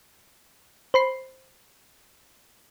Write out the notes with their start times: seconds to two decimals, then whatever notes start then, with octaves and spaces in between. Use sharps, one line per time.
0.94 C5 B5 C7